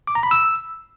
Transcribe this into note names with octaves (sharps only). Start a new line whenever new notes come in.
D6
A#5
B5
E6